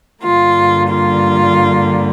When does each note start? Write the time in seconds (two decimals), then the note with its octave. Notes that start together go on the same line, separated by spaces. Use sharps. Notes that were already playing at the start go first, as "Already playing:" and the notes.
0.24 G2 D3 G3 A#3 F4
0.90 F4